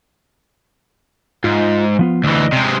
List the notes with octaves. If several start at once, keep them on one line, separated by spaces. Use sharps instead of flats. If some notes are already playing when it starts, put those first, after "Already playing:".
G#2 F4
F3 B3 F4
D2 E3 D5 D#5
C3 G#3